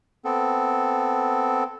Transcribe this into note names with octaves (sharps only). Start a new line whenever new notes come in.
B3 C4 A4